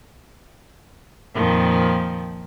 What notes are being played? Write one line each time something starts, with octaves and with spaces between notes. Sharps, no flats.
F2 A#2 D#3 F3